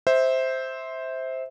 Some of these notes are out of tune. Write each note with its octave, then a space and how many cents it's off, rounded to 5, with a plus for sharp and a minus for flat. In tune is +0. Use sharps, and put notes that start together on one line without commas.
C5 +0 E5 -20